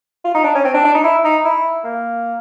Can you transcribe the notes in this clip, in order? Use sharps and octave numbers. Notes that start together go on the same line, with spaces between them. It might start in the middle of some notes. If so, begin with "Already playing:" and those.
F4
D#4
D4
C#4
C4
D4
D4
D#4
E4
D#4
E4
A#3